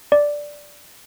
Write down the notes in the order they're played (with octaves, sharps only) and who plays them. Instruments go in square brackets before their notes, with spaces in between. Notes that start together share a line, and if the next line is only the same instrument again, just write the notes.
[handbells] D5